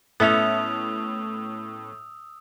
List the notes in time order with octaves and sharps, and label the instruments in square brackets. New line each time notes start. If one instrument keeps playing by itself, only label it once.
[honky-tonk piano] A2 [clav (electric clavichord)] B3 C#4 [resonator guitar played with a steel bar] A4 E5 [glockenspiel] D#6 E6 F7